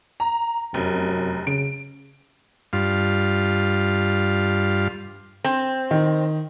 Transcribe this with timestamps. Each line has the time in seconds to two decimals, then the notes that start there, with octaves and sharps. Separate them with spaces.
0.20 A#5
0.74 F1 F#2
1.47 C#3 D7
2.73 G2 F4
5.44 C4
5.91 D#3